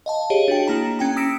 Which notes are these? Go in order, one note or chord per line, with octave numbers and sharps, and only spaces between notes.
D#5 F5 A5
G4 G#4 C#5 D#5
D4 F#4 G5
A#3 E4 A#5
C#4 G5 A#5
D#6 E6 A#6 B6 D7 E7